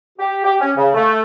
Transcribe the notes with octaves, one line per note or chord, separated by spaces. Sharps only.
G4
G4
C#4
C#3
A3